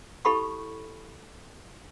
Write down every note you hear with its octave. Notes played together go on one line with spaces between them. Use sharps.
E4 G4 A4 B5 C#6